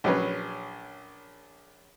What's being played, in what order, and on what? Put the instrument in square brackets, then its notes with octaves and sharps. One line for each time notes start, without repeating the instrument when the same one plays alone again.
[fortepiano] A#1 F#3 C#4 B4